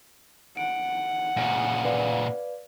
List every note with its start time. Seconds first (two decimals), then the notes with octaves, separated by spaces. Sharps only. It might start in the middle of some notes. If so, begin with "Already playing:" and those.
0.57 F#5 D7
1.37 A#2 C#3
1.85 B4 D5 F5